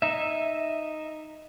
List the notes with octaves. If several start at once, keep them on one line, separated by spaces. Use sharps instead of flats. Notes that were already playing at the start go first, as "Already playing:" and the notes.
D#4 E5